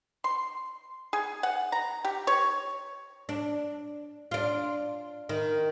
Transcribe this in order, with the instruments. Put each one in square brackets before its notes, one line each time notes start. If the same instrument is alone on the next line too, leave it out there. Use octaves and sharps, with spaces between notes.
[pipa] C6
G#4
F#5
A#5
G4
C#5
[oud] D4
D4 F4
D#3